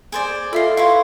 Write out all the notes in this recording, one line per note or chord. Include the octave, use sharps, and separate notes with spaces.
G#4 C5 D5
F4 A4 D#5 E5 B5 C7
E4 B4 C#5 F5 C6